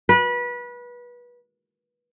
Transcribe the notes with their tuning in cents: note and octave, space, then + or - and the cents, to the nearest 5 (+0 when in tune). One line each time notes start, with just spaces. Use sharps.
B4 -25